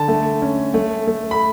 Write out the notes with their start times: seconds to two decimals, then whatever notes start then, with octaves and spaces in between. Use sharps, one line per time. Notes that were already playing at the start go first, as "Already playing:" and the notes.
Already playing: D3 A5
0.08 A3
0.42 C#4
0.74 A3
1.07 A3
1.31 B5